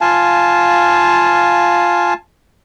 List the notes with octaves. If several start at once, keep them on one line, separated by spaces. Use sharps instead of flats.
F4 F5 G#5 A5